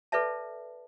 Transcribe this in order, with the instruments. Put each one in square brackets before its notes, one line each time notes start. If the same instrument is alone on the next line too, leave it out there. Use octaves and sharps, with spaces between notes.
[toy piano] A4 B4 D5 E5 A5